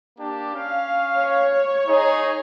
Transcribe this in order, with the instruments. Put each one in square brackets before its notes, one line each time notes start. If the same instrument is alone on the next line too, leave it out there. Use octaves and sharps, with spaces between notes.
[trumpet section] A#3 D4 G4
C#4 F5
[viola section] C#5
[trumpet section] D#4 G#4